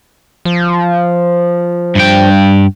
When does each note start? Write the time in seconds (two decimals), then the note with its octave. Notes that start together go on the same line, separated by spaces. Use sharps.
0.45 F3
1.95 G2 G5